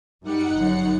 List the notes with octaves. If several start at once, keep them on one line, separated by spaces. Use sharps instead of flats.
F#2 G3 D#4 F#5 C#7
G1 F#2